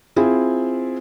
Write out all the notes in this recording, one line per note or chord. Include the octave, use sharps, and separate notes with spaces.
C4 E4 F4 G#4